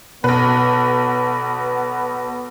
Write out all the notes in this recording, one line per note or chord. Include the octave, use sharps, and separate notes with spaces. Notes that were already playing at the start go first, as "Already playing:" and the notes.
B1 B2 B3 B4